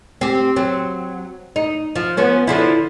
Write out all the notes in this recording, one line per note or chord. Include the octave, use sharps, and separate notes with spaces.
C4 G4
F#3 C4
D#4
F3
F3 B3 C#4
D3 F3 E4